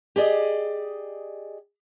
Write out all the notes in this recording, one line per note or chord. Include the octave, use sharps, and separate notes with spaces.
G4 G#4 D5 D#5